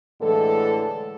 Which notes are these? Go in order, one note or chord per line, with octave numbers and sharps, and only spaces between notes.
A2 D3 E3 G#3 A4